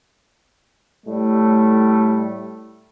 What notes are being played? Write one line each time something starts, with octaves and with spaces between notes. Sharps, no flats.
A2 G3 A3